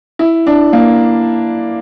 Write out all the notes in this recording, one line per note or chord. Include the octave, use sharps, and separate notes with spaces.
E4
D4
A#3